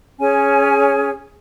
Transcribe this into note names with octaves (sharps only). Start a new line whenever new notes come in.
C#4 G#4 C#5 G#5